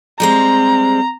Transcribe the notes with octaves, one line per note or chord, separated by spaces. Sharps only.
G3 G#3 C4 A#5